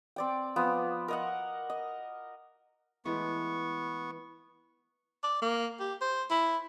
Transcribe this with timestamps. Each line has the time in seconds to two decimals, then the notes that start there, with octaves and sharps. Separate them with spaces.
0.16 C4 D5 G5
0.56 F3 B3
1.08 A#4 D#5 F#5
1.70 D#5
3.05 E3 G#3 A3 B3 C#6
5.23 D5
5.42 A#3
5.79 G4
6.01 C5
6.30 E4